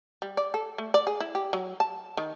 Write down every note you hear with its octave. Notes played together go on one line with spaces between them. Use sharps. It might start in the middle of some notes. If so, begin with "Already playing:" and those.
G3
D5
A4
A3
D5
G#4
E4
G4
F#3
A5
D#3